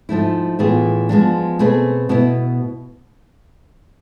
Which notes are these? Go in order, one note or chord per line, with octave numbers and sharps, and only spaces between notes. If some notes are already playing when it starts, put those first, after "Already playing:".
G#2 F3 A3 E4
A2 E3 B3 F4 G#4
F3 G#3 B3 D4
B2 A3 C4 G#4 B4
B2 B3 E4 B4